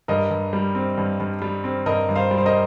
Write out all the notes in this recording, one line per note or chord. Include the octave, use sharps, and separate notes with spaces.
G2 A#4 D#5
G2
G3
C4
G2
G2
G3
C4
G2 A#4 D#5
G2
C5 F5
G3
C5
A#4 D#5